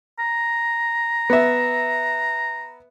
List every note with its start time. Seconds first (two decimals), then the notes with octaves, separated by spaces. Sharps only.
0.19 A#5
1.30 B3 E5